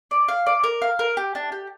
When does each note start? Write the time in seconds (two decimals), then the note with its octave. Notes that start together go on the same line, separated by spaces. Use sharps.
0.11 D5
0.28 F5
0.46 D5
0.63 A#4
0.82 F5
0.99 A#4
1.17 G4
1.35 D4
1.52 G4